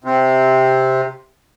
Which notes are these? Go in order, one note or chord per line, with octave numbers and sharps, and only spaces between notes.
C3